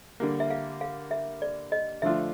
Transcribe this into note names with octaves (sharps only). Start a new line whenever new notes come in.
D3 G3 A#3
E5
F5
F5
E5
D5
D#5
D3 F3 A3 D4 F4 E5